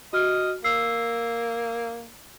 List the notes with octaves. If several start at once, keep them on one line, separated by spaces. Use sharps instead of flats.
F#4 D#5 F6
A#3 E6 C7